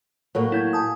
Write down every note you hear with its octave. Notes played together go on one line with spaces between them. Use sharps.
A2 F#3 A#3
E4 G6 G#6
G#5 A5 D#6